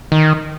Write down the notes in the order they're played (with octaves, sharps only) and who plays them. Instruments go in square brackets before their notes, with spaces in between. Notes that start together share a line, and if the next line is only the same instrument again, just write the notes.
[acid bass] D#3